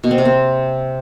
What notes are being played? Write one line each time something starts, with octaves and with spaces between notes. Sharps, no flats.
B2
C4
C3
C4